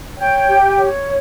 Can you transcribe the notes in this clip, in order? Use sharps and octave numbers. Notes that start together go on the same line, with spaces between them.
C#5 G5
G4
C#5